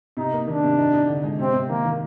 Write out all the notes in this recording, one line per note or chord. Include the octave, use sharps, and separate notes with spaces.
C3 D#4
A#3
D#3 D4
C3
D#4
D#4
D3
G#3
C3 C4
C3
D#3 A#3
D#3